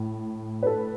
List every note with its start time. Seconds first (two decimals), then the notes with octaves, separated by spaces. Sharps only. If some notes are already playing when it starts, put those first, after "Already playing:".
Already playing: A2
0.63 B4
0.67 A4